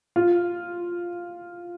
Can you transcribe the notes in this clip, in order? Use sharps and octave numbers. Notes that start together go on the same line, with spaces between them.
F4